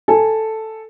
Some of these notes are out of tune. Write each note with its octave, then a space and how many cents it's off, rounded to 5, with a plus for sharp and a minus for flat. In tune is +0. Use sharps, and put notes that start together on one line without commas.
A4 +0 G#5 +0